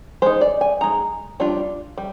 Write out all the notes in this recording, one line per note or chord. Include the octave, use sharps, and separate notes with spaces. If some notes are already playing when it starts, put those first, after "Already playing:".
G#3 D#4 C5
D5
G#5
G#3 D#4 A#5
G3 D4 F4
G3